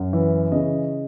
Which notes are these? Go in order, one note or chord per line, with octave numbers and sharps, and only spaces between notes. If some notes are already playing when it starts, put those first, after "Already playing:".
Already playing: F#2
E3
C#3 D#5